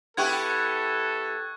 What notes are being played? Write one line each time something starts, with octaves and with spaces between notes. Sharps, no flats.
B3 E4 G4 A4 C#6 F#6 G#6